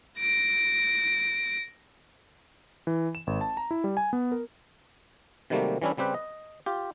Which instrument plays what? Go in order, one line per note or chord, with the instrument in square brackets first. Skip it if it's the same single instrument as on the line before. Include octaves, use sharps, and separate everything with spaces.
[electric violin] A#6 D7
[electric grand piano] E3
E7
G#1
A5
A#5
E4
G3
G#5
B3
A#4
[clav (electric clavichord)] C3 D#3 F#3 G3 A3 A#3
E3 G3 C#4 D4 E4
C#3 G3 C4 G4 B4
D#5
F4 G4